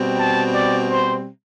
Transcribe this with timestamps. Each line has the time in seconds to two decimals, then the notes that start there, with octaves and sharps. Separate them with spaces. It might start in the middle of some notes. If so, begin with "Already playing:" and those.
Already playing: B2 G3 C4
0.19 A5
0.55 D5
0.91 C5